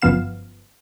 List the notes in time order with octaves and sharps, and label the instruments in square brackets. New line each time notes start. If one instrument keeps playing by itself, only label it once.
[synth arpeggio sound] G1 F#2 F3 B3 F5 E7